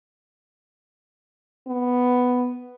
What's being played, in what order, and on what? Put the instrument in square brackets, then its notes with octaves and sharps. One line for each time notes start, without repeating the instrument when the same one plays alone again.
[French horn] B3